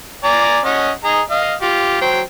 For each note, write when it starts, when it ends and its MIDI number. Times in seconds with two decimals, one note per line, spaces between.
0.24 0.59 74
0.24 0.59 80
0.24 0.59 82
0.64 0.91 61
0.64 0.91 75
0.64 0.91 78
1.05 1.21 68
1.05 1.21 75
1.05 1.21 82
1.31 1.54 75
1.31 1.54 77
1.62 1.99 65
1.62 1.99 67
2.01 2.20 54
2.01 2.20 72
2.01 2.20 79